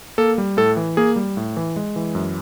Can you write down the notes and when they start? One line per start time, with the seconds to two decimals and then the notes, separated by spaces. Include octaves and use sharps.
0.18 A#3 A4
0.38 G3
0.57 A2 A4
0.77 E3
0.97 A#3 G#4
1.16 G3
1.37 A2
1.57 E3
1.76 G#3
1.96 E3
2.15 F#2